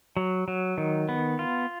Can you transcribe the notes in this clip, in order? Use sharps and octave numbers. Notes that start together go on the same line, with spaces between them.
F#3
F#3
D#3
B3
F4